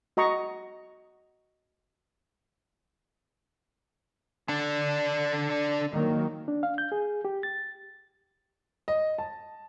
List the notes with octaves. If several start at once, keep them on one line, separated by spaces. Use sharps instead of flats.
F#4 D#5 A#5 C#6
D3 D4
D#3 F#3 A#3
D4
F5
G6
G#4
G4
A6
D#5
A5